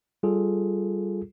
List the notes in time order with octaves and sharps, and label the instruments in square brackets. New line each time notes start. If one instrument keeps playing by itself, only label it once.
[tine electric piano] G3 F4 G#4 A4